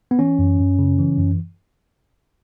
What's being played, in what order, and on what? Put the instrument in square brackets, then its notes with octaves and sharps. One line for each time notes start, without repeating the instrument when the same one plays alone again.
[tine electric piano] B3
E3 C#4
F#2
F#2
C#3
E3
F#2